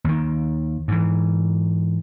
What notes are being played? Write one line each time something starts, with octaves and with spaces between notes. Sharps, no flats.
D#2 D#3
G#2 E3